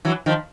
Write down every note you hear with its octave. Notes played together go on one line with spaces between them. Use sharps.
E3 F#3
D#3 F3